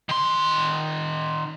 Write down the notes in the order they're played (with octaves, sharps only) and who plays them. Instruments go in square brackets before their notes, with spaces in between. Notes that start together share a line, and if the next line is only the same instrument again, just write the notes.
[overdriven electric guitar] D#3 C6